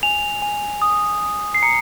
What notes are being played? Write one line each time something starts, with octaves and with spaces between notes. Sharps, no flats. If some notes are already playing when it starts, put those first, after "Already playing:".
G#5 F7
G#5
D#6
D#6
C7
A#5 C#7